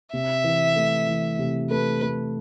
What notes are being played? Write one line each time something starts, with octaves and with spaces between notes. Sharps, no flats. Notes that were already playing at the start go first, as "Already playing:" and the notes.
C3 E5
E3
A3
E3
C3
A3 B4
A3